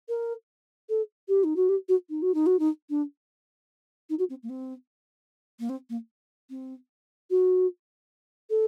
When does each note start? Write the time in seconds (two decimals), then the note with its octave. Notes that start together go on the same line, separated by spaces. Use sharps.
0.09 A#4
0.89 A4
1.28 G4
1.44 D#4
1.56 F#4
1.69 G4
1.88 F#4
2.09 D#4
2.22 F#4
2.34 D#4
2.46 F#4
2.59 D#4
2.89 D4
4.09 D#4
4.19 F#4
4.29 C4
4.43 A#3
4.49 C4
5.59 A#3
5.69 C4
5.89 A#3
6.50 C4
7.30 F#4
8.50 A4